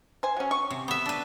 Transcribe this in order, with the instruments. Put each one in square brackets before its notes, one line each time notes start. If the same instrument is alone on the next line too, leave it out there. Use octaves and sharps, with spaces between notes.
[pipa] C5 G#5
F#3 C#4
C#6
[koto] C3
B3 E5
D4 B4